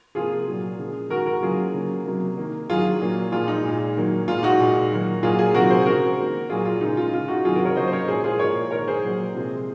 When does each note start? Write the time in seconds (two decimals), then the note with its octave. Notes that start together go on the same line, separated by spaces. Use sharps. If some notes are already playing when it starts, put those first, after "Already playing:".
0.15 C3 F3 A#3 F4 G#4
0.47 A#2 F#3 A#3
0.79 C#3 F3 G#3
1.10 D#3 G#3 F#4 A#4
1.26 F#4 A#4
1.42 C#3 F#3 A#3 F4 G#4
1.74 C#3 F#3 A#3
2.06 C3 F#3 A#3
2.38 D#3 A#3
2.69 D#3 F#3 A#3 F4 G#4
3.01 A#2 F#3 A#3
3.32 A#2 F3 G#3 F4
3.48 D#4
3.64 A#2 G#3
3.96 D#3 F#3 A#3
4.28 A#2 G#3 F4
4.43 D#4 F#4
4.60 A#2 G#3
4.92 D#3 F#3 A#3
5.23 A#2 F#3 A#3 F4 G#4
5.39 F4 G#4
5.54 C3 D#3 F#3 F#4 A#4
5.70 G#4 C5
5.86 C#3 F3 G#3 F#4 A#4
6.18 D#3 A#3
6.49 A#2 F#3 A#3 F4 G#4
6.65 F4
6.81 C#3 G#3 D#4
6.97 F4
7.13 C#3 G#3 F4
7.28 D#4 F#4
7.45 C3 D#3 F#3 F4 G#4
7.55 F#4 A#4
7.65 A#4 C#5
7.76 C#3 F#3 A#3 C5 D#5
7.88 C5
7.92 A#4 C#5
8.08 A#2 F3 G#3 G#4 C5
8.24 F4 G#4
8.39 A#2 F3 A#3 A#4 C#5
8.71 D#3 G#3 A#4 C#5
8.88 G#4 C5
9.04 A#2 F#3 A#3
9.35 C3 F3 G#3